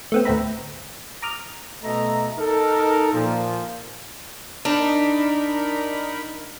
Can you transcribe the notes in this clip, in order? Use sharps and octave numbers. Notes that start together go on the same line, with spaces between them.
A3 B3 C4
D2 A2 C4 E5 A#5 B5
A#5 D6 D#6 F6
B2 A3 D#5 E5 A#5
D#4 A4 A#4
A#2 F3
D4 D#4 A#4 B5